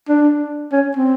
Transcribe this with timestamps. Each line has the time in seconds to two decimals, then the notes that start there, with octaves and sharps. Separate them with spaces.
0.09 D4
0.72 C#4
0.97 C4